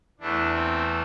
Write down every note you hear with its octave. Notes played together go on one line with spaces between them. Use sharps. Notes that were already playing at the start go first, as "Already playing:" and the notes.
E2 E3 A3 D4
C4